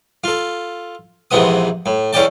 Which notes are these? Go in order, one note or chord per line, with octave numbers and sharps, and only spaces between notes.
F4 A4
A#1 G#2 C3 E3 B3 D#6
A2
E2 E3 C#4 D5 G5 A5